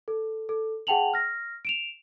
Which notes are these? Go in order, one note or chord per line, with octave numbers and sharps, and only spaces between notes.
A4
A4
G#4 F#5 G5 A5 F7 F#7
F6 A#6
D7 E7 F7